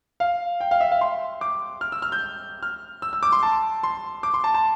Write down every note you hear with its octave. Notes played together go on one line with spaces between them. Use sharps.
F5
G5
F5
E5
F5
C6
D6
F6
E6
F6
G6
F6
E6
E6
D6
C6
A5
C6
D6
C6
A5
A5